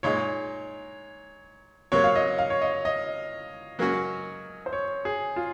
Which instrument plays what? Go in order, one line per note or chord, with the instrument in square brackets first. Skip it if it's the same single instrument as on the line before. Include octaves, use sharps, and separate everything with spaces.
[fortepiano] A#2 G#3 D#4 [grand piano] C#5
[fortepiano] C3 F#3 A#3 [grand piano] C#5
[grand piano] F5
D#5
F5
C#5
D#5
D#5
[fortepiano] F#3 A#3 C#4 F#4
[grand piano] C5
C#5
G#4
F4